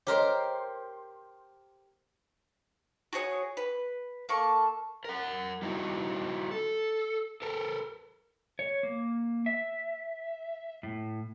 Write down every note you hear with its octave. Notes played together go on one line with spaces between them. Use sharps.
G4 A#4 C5 C#5 D#5
F#4 G#4 C#5 D#6
B4
A#3 A4 C#6
A#4 F#5
G3 D#4 E4 F#4
A4
A4 A#4
C#5
A#3
E5
A2